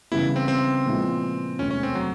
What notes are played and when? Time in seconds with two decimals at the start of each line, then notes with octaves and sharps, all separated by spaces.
0.12 C#3 E3 G3 B3 E4
0.36 C4
0.48 C4
0.86 A#2 F3 G#3 B3 E4
1.59 E1 D2 C3 C#4
1.71 C#4
1.83 C4
1.95 F#3